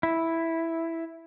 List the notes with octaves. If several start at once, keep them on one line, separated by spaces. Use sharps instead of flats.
E4